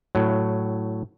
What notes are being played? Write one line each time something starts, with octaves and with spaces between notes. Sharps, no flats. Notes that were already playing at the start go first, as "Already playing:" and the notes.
A2 F#3